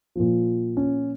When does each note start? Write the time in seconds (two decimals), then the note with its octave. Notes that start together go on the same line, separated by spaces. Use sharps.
0.16 A#2 F3
0.77 C#4